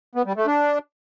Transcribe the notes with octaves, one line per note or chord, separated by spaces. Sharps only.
B3
G3
A3
D4